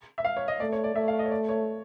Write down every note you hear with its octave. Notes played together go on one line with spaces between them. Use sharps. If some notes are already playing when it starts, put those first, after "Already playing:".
E5
F5
C#5
D#5
A3 D5
C#5
D5
A3 E5
F5
D#5
C#5
D5
C#5